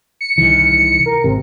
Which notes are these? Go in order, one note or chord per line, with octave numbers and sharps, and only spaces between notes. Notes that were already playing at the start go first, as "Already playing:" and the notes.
C#7
C2 D#3 E3
A#4
G#1 C3